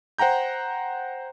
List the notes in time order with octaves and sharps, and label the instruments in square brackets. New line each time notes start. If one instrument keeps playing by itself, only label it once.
[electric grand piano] C5 F#5 G5 A#5 G6